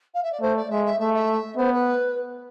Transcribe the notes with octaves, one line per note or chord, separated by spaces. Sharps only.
F5
E5
D5
A3 C5
D5
G#3 E5
E5
A3 E5
E5
B3 C5
B4